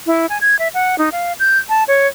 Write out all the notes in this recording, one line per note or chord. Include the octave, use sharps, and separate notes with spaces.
E4
G#5
G#6
E5
F#5
D#4
F5
G6
A5
C#5